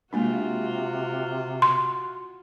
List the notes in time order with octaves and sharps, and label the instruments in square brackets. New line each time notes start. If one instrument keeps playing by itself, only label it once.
[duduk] C3 [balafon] G#3 A#3 D4 [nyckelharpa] F4 F#4
[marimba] C6